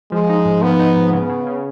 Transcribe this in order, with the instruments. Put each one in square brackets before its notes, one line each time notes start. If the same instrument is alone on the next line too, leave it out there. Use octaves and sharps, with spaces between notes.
[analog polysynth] F3 [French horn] G#3
[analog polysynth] D#4
G#2
[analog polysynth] F3 [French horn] B3
[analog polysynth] D#4
G#2
[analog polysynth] C#3 [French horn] B3
[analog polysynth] C#3
C#3